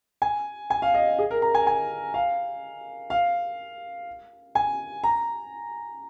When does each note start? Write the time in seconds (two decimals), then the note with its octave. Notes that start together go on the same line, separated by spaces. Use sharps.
0.22 G#5
0.70 G#5
0.82 F5
0.95 D#5
1.19 G#4
1.31 A#4
1.42 A#5
1.55 G#5
1.67 G#5
2.14 F5
3.10 F5
4.55 G#5
5.04 A#5